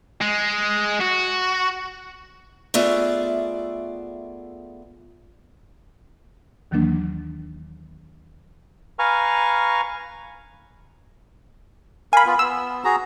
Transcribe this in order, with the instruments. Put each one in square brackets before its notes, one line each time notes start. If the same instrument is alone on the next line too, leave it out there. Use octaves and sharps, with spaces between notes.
[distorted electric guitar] G#3
F#4
[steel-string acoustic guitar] A3 B3 F4 G#4 D5 E5
[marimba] D#2 D#3 E3 F#3 A#3 D4
[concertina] B4 F5 G#5 A#5 C#6 F6
[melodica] A#4 F5 [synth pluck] G#5 B5
[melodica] B3 F4
[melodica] B3 [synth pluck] E6
[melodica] F#4 G#4 A#5